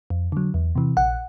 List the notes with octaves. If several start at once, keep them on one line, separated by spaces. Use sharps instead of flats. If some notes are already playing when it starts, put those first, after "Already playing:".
F2
D3 F#3
E2
C3 E3
A#1 F#5